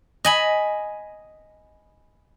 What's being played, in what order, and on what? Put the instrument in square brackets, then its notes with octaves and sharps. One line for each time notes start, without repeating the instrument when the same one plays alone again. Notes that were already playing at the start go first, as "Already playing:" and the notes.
[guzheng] D#5 G#5 B5